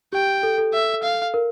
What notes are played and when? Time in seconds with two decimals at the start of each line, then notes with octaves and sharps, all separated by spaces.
0.13 G4 G5
0.43 A4
0.58 A4
0.74 E5
1.03 F5
1.34 A#4